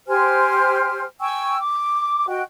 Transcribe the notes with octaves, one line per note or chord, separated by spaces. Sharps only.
G4 C5 G#5 F6
G5 G#5 C#6 E6
D6
F#4 D#5 G5